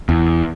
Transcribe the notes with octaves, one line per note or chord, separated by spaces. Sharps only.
E2